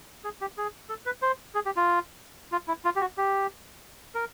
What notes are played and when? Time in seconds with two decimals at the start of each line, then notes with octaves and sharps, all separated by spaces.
0.24 G#4
0.41 G4
0.58 G#4
0.89 A4
1.06 B4
1.22 C5
1.55 G#4
1.66 G4
1.77 F4
2.52 F4
2.68 E4
2.85 F4
2.96 G4
3.01 F#4
3.17 G4
4.15 A#4